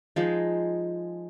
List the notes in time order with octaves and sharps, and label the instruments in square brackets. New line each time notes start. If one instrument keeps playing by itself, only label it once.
[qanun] F3 G#3 D#4